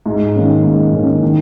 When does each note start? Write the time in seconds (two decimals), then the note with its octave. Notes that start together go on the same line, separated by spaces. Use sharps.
0.06 G#2
0.35 D#3 A#3 C#4
0.64 G#2
0.93 D#3 A#3 C#4
1.22 D#3